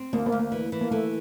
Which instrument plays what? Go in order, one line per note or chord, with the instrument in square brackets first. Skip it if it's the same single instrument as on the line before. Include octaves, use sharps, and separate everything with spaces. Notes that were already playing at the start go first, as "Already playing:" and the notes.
Already playing: [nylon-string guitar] C4
[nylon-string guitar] D2 [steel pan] A#3
[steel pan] A#3
[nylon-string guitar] D2
[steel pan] A#3
[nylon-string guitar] E3
E3
[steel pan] A#3
[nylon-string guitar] E3 [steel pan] A3